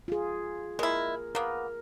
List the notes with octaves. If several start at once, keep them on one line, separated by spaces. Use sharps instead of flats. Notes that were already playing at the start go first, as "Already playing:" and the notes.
F4 G#4
G#3 E4 A#4
A#3 B3 A#4